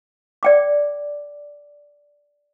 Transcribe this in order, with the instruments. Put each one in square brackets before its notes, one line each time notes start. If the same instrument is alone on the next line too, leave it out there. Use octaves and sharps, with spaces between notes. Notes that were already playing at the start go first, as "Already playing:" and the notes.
[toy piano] D5 G5 D6